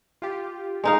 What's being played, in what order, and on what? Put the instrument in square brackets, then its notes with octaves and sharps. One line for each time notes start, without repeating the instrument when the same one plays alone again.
[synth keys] F4 G4
[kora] G#3 D#4 F5